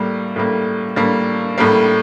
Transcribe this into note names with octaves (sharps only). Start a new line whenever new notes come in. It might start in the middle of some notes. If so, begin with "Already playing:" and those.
Already playing: A2 G3 A#3
A2 G3 A#3
A2 G3 A#3
A2 G3 A#3